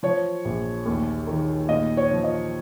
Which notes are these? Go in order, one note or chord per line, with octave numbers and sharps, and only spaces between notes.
F3 C#5
A#1
D#2
D#3
A#2 D#5
C#5
F3
D#5